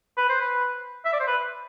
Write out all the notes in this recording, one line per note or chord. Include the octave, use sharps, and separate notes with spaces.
B4
C5
B4
E5
D5
C5
B4